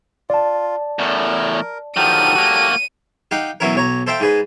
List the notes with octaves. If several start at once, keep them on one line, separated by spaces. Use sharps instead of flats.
F4 D5 A5
E2 A2 A#4
D#3 F3 F#3 G4 A4 D#7
A#3 F#4
D#4 G4 F5 F#5
B2 E3 F#3 C#4 E4 A#4
B1 C#5 A#5
A4 C5 E5 F5 G5
G#2 G#4 B4